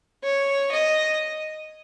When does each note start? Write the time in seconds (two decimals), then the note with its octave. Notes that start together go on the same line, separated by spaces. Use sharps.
0.24 C#5
0.72 D#5